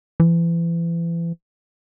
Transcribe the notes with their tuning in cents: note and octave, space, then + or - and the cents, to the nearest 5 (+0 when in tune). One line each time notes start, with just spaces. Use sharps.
E3 +35